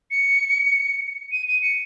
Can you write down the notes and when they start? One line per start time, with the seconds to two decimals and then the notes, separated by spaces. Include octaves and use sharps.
0.11 C#7
1.32 D#7
1.47 D#7
1.62 C#7